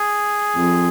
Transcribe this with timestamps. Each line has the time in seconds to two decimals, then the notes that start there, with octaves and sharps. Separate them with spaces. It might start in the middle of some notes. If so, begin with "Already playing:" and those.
Already playing: G#4
0.56 F2